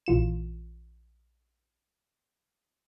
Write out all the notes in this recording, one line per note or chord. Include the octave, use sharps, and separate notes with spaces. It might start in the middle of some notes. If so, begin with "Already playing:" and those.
A#1 E3 F4 E7